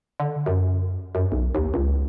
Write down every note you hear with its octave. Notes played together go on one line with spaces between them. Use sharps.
D3
F#2
F#2
B1
D#2
C#2